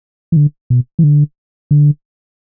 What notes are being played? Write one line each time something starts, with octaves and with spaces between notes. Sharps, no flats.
E3
D3
B2
E3
D3
D3